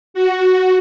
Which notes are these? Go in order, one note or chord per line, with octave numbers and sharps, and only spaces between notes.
F#4